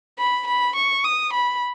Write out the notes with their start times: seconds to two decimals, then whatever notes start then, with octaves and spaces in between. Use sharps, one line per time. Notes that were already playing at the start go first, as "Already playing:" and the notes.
0.19 B5
0.47 B5
0.76 C#6
1.05 D#6
1.33 B5